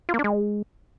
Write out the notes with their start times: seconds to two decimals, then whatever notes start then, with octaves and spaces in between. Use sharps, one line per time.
0.09 F4
0.14 A#3
0.19 D4
0.24 G#3